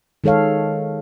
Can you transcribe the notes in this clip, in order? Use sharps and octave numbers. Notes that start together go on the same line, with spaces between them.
D#3 G#3 A4 C#5 F5